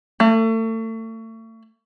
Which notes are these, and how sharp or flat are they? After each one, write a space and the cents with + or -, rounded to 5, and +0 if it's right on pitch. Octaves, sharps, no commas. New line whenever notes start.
A3 +35